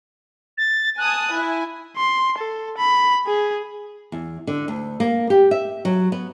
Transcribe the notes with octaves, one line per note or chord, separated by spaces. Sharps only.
A6
G#5 A5 D#6 F#6
E4 G#5
C6
A4
B5
G#4
E2
D3
D2
A#3
G4
E5
F#3
B3